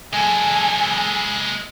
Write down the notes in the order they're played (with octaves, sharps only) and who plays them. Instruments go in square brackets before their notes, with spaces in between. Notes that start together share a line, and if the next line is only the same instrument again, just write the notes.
[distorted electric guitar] G#3 A4 [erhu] G#5